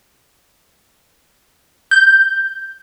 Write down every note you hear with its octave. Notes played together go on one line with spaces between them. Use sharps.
G6